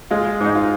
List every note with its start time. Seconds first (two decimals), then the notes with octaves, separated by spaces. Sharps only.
0.11 G#3 F4
0.41 G#2 D#4
0.55 F4